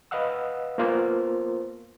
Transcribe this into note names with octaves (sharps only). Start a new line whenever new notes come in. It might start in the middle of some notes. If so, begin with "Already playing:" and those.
B4 D#5 F5 F#5 E6
A#3 B3 F4 A#4 C5